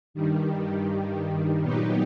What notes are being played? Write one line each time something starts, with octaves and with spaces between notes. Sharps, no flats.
G2 D#3 G3
A#2 F#3 B3 D#4 G4